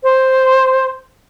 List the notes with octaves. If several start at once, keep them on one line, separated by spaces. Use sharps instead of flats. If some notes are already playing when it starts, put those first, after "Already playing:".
C5